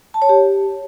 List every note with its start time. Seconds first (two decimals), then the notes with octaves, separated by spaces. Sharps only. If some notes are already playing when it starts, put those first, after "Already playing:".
0.14 A5
0.22 C#5
0.29 G4